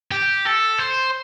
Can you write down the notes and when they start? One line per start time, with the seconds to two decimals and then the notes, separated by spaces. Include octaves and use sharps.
0.12 G4
0.46 A4
0.79 C5